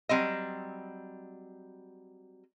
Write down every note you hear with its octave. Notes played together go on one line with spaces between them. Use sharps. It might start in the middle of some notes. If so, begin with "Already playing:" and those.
F#3 G3 C4 D#5